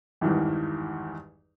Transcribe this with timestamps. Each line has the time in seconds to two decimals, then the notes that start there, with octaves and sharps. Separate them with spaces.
0.21 G#1 E2 G2 D#3 E3